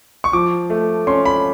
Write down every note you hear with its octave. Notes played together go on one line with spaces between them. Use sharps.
C#6
F3 D6
A3
C#4 C6
B5